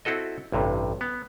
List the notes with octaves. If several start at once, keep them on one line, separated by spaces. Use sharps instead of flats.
C4 E4 F#4 A4 D#5
A1 G2 C3
B3